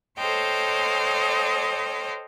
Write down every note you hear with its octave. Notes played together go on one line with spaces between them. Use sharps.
A4 C5 C#5 D#5 F5 G5